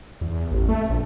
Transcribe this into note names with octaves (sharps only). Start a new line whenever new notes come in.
E2
A1
A3
A#1